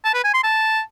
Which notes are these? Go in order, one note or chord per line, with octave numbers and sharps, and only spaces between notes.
A5
B4
G#5
C6
A5